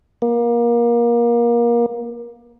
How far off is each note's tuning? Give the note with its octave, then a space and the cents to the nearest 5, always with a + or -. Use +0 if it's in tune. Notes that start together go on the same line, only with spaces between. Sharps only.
A#3 +25